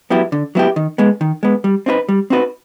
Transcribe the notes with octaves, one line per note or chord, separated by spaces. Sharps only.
F#3 B3 E4 G4
D3
F#3 B3 E4 G4
D#3
G#3 B3
D#3
G#3 B3
G3
C4 D#4 F#4 B4
G3
C4 D#4 F#4 B4